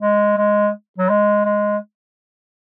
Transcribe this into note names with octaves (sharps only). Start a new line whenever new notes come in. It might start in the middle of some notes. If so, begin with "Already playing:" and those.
G#3
G#3
F#3
G#3
G#3